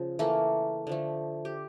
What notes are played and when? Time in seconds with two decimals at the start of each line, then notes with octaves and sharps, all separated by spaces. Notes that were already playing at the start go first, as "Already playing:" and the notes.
Already playing: C#3 F3
0.19 E3 A3 A#3 A4
0.87 D3 F3 A3
1.45 G4